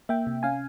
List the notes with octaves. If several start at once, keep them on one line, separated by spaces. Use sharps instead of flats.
A#3 E5 G5
C3
C#4 F5 G#5